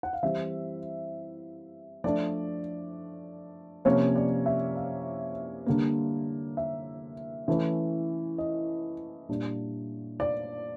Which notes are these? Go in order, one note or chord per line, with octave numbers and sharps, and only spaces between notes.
F#5
F5
E3 G3 C4 E5
F3 A3 D4 D5
C3 F3 A#3 C#4 C#5
D5
E5
F5
D3 G3 A#3
E5
E3 A3 C#4
D#5
A#2 G3 A#3 D4
D5